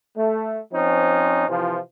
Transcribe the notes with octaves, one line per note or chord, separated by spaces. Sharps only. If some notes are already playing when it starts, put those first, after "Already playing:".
A3
F3 C4 C#4 D#4
C3 E3 F3